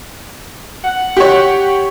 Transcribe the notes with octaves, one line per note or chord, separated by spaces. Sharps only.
F#5
G4 C#5